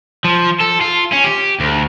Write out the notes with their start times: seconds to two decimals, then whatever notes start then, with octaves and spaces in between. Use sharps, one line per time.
0.24 F3
0.60 A4
0.81 F4
1.12 C#4
1.24 G4
1.60 D2